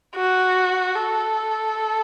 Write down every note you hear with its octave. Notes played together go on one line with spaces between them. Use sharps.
F#4
A4